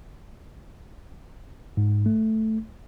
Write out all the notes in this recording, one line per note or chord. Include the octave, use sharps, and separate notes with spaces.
G#2
A3